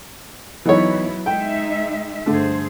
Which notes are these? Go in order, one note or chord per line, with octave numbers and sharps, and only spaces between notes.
E3 F#3 B3 D#4 E4 C#5
G#3 D#4 E5 G5
G2 D3 A3 G#4 C5